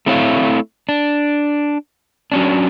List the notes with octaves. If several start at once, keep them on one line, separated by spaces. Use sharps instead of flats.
A3 C4 E4 C#5 F5
D4
F#3 C#4 D4